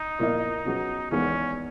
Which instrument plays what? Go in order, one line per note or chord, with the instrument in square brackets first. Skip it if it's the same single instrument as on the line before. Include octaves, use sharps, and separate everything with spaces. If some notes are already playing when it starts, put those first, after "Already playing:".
Already playing: [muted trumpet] D#4
[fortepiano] A#2 A#3 E4 A#4 D#5
B2 F#3 C#4 G#4 B4
[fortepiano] E2 D#3 G#3 B3 [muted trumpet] C#4